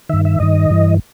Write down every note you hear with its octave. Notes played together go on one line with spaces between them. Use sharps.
G2 D#3 E5
E5
G2 D#3 D#5
G2 E3